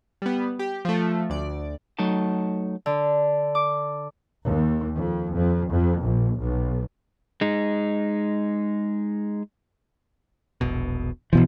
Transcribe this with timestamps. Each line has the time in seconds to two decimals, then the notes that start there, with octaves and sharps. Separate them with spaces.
0.22 G3 B3
0.59 G4
0.85 F3 A3
1.30 D2 D5
1.99 F#3 A3 D#4 A5
2.86 D3
3.55 D6
4.44 D#2
4.95 F2
5.33 F2
5.71 F2
6.01 A#1
6.39 B1
7.41 G#3 D#4
10.61 E1 A#1 B2
11.33 A1 F#2 B2 E3 F3